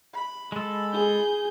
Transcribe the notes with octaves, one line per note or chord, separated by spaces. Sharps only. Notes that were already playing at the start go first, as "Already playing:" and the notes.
B5
G#3 A4
G#4 G6